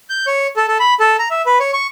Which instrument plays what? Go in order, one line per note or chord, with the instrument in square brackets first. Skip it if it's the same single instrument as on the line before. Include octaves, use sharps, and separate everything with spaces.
[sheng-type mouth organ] G6
C#5
A4
A4
B5
A4
A#5
E5
B4
C#5
C#6